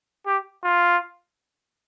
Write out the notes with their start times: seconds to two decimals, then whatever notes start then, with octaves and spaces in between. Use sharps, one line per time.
0.26 G4
0.64 F4